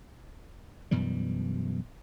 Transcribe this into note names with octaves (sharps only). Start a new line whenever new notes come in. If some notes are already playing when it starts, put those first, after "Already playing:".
F#2 B2 E3 G3